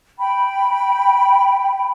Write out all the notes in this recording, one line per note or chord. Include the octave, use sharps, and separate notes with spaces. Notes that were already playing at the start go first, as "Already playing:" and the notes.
G5 B5